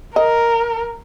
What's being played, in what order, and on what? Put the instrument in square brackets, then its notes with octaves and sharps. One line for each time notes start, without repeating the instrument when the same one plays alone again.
[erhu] A#4 [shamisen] D#5